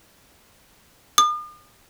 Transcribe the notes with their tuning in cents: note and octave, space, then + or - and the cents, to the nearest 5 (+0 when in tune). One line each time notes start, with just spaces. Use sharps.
D#6 -45